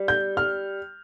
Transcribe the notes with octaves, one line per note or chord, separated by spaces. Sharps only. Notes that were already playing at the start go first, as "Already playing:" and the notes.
Already playing: G3
G6
F6